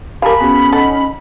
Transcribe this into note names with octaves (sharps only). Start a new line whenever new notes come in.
G4 A#4 F5 G#5 A5 B5
B3 C#4 F#4 G#4
D#4 A4 F#5